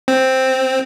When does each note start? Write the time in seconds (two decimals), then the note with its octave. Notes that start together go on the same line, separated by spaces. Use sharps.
0.08 C4